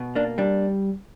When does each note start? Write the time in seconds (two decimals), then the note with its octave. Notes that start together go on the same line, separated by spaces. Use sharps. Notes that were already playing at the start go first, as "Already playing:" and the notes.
Already playing: B2
0.15 A#3 D4
0.38 G3 D4